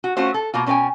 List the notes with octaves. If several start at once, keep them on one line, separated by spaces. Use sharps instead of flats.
F#4
A3 C#4 F4 F#4 C5
A4
B2 A#3 F4
B2 C#4 A#4 B4 G5 G#5